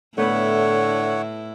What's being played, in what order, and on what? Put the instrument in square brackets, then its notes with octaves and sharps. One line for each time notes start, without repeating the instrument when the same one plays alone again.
[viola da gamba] A2 E4 [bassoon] D3 [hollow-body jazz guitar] A3 B3 B4 [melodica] C#5 F#5